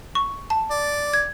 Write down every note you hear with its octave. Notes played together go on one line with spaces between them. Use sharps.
C#6
A5
D5
G#6